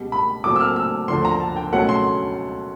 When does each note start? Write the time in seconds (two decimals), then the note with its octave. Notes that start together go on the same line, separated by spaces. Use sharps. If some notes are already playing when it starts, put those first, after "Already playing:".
Already playing: C#2 B2 G3
0.12 B5
0.44 A#2 F#3 A3 C4 D6
0.56 E6
0.60 F6
0.76 E6
1.08 D2 D3 F3 C6
1.25 A#5
1.40 A5
1.56 G5
1.72 C#2 B2 F#3 A3 C#4 F#5
1.89 C6